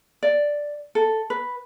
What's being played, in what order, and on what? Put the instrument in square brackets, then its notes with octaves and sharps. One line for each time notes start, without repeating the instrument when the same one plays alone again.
[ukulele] D5
A4
B4